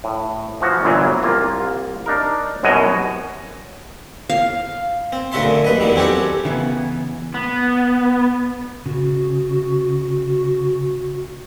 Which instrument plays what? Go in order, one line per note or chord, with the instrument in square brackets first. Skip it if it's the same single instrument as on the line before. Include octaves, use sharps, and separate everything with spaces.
[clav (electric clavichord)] A2
E3 F3 F#4
G1 A#2 E3 F#3
C2 A#3 F4
D4 D#4 A#4
C2 F#2 B2 F#4 D#5 G#5
[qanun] F5
[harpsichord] C4
D2 C#3 F#4 E5 A5 C6
F#2 D3
D#2 B4 D#5
E2 D#3 F#3 G3
C4 C#4 F#4 G4 A4
[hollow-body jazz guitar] C#3 E3 B3
[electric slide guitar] B3
[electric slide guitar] C#3 [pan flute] F#4